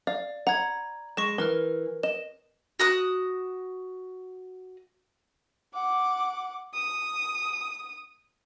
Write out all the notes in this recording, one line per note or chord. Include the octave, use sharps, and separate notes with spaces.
D5 F5
F#5 A#5 B5 G#6
G#3 C#6 A#6 E7
E3 A#4 B4 F6
D#5 E7
F#4 D#6 F#6
F#5 D6
D#6